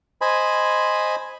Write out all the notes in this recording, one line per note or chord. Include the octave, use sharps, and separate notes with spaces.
C5 D#5 G#5 B5